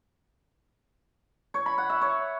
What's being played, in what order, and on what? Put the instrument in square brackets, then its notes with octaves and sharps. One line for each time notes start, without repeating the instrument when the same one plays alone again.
[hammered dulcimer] C#5
B5
F#5
E5
C#5